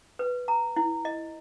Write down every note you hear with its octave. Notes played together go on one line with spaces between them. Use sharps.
B4
A#5
E4
D#5